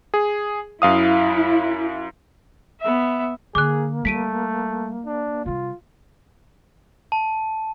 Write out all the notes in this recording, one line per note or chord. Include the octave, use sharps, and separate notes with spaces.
G#4
F#2 E4 F5 D#6
B3 E5
D3 A#3 G#4 D6 F#6
G3 A3 B6 D7 D#7
D4
C3 G3 F4
A5